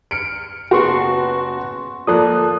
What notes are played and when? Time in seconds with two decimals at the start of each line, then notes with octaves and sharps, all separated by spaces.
0.11 F6 C#7 D7
0.71 F#1 B3 F#4 F#5 C6 C#6
2.07 F3 A#3 A4 D5 D#6 F#6